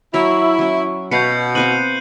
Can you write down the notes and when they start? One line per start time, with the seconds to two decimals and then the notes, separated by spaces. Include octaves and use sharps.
0.14 F#3 E4 A#5
0.59 F#3 C#4
1.11 B2 B4 F5 G6 C7 C#7
1.55 C4 B4 F5 F#6 D#7 F#7